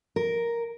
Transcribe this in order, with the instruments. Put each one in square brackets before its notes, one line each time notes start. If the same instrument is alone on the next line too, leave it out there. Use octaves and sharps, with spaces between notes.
[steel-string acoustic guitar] A#4